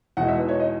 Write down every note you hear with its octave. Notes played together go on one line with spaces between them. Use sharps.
E2 B2 G#3 D#4 F#5
E5
B4
C#5
D#5